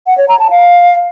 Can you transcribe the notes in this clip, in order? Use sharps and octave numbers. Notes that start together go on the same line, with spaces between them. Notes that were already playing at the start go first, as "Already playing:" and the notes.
F#5
C#5
A#5
A5
F5